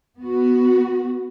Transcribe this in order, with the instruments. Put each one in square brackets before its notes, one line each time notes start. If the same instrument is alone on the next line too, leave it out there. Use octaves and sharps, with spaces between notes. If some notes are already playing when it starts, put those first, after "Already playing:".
[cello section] B3 F#4